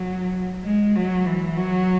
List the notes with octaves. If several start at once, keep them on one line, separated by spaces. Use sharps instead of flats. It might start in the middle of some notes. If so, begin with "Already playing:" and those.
Already playing: F#3
G#3
F#3
E3
F#3